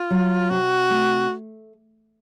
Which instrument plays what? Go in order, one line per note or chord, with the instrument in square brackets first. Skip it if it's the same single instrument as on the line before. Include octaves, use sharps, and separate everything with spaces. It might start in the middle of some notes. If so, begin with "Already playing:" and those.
Already playing: [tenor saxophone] F4
[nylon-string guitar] F#3
[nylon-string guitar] C3 [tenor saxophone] F#4
[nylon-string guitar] A3